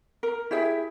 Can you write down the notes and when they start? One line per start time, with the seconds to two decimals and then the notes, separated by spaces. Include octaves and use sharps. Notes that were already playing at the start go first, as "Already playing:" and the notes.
0.23 A#4
0.51 E4 G4 G#4 E5